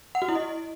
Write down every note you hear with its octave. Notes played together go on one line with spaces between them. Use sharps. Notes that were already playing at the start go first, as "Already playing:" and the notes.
F#5
F#4
E4
D#5